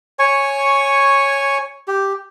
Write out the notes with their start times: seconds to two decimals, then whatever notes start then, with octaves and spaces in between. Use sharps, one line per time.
0.19 C#5 G#5 C#6
1.88 G4